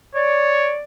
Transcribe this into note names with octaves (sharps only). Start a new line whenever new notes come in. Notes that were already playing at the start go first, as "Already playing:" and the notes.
C#5 D5